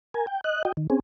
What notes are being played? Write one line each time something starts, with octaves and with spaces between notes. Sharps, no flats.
A#4 G#5
G5
D#5 F#6
F#4 D#5 G5
D#3
C4 C#4 G#4